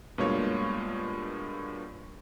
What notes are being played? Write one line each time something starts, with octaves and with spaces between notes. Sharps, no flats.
G2 B2 G#3 A#3 F4 C#5